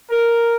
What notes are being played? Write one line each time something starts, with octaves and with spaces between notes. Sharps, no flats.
A#4